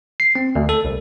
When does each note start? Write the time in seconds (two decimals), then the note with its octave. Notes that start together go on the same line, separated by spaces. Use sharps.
0.20 C7
0.35 C4
0.55 D2
0.69 A4
0.85 C2